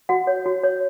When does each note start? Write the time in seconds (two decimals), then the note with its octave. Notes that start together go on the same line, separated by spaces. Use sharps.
0.09 F#4 F#5
0.27 C#5
0.46 F#4
0.63 C#5